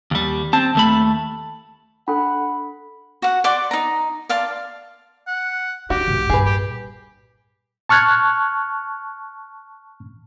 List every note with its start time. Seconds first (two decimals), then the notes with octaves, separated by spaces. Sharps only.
0.11 D#2 G3
0.53 C4 A5
0.75 D#2 A3 B5
2.08 D4 A4 F#5 B5
3.22 F#4 F#5
3.44 D5 F#5 C6 D6
3.71 D#4 A#5
4.29 D5 F5 A5 C6
5.27 F#5
5.90 D4 F#4 G4
6.07 B1 G#2
6.30 G2 A#2 G#4 B4
6.45 G4
7.89 A5 C#6 F6 F#6 G#6